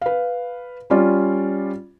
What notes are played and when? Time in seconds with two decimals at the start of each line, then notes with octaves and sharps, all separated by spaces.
0.02 B4 F5
0.90 G3 C#4 F4 D5